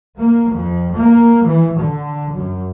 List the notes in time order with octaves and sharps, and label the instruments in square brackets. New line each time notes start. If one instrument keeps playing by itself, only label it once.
[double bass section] A#3
F2
A#3
E3
D3
F#2